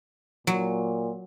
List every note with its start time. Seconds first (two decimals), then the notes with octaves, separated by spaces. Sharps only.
0.47 A#2 F#3